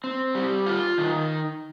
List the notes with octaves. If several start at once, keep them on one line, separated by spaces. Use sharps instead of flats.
C4
G3
F4
D#3